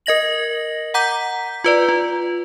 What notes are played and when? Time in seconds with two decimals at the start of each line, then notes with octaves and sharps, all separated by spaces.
0.06 A#4 D#5 A#6 F#7
0.94 F#5 A#5 D6 G6 B6
1.64 F4 B4 D5
1.89 F4